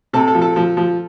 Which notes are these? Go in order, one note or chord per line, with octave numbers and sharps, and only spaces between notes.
C3 A4
A4
F3
A4
F3
F3